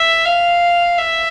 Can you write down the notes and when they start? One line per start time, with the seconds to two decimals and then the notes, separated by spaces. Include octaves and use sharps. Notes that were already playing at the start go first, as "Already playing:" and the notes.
Already playing: E5
0.25 F5
0.98 E5